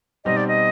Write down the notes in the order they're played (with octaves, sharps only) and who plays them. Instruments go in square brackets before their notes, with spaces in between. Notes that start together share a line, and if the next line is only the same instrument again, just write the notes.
[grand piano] B2 G3 C4 D#4 G4 [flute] D#5
[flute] D5
D#5